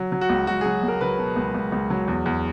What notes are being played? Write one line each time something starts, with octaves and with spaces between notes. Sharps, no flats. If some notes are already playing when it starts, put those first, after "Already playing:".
Already playing: F#3
F#3
F#4
C#2
C#2 F#4
G#4
F#3
C#2
A#4
F#3 B4
B2
C#2
C#2
C#2
F#3
E2
E2